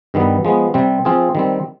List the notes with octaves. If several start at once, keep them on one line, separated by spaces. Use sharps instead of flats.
G2 D#3 G3 B3
F3 G#3 B3
C3 G3 C4
F3 C4 F4 G#4
D#3 G3 C4